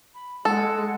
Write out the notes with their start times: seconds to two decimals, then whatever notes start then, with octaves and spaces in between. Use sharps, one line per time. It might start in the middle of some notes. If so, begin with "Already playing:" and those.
0.14 B5
0.45 G#3 A4 F#5